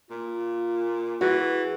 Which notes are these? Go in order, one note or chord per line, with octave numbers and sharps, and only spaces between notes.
A#2 F4
E3 F#4 G#4